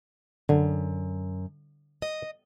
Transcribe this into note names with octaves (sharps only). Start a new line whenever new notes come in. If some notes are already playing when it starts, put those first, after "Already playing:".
F#2 D3
D#5